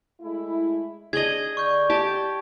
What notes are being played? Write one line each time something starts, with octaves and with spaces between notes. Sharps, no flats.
G#3 A3 E4
D4 G#4 D#5 G#6 G7
D3 D5 C#6 G6
G4 A5